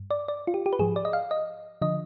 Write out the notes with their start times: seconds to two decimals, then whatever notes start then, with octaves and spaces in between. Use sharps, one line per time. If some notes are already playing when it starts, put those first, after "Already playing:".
Already playing: G2
0.11 D5
0.28 D5
0.47 F4
0.54 G4
0.66 G4
0.73 B4
0.79 G#2 F3 G#4
0.96 D5
1.05 D#5
1.13 F5
1.31 D#5
1.82 D3 F3 D#5